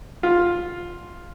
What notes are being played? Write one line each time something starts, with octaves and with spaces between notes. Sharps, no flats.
F4